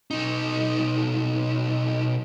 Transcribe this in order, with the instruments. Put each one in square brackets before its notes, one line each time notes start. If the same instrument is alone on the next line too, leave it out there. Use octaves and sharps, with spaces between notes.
[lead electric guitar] B1 D#4